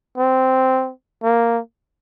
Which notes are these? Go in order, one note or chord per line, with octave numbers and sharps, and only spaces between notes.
C4
A#3